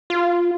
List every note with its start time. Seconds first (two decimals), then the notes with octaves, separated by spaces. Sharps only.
0.10 F4